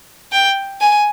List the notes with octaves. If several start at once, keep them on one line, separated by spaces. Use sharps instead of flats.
G5
G#5